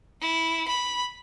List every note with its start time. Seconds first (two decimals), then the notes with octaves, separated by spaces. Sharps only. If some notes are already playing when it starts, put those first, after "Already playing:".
0.21 E4
0.68 B5